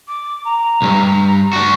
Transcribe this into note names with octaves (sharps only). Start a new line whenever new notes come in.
D6
A#5
B1 G2
D4 F#4